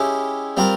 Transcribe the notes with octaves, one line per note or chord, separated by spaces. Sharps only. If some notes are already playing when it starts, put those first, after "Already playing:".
Already playing: G#3 C#4 E4 G4
G3 C4 F4 A#4